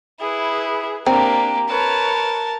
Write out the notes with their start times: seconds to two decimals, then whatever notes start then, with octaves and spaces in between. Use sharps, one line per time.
0.20 E4 G#4 B4
1.07 A#3 C4 D4 G4 A#5
1.69 A#4 B4 C#5 A5